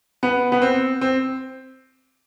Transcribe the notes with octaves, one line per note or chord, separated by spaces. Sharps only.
B3
B3
C4
C4